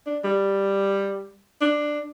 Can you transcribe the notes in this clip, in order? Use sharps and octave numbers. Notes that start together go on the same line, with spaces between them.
D4
G3
D4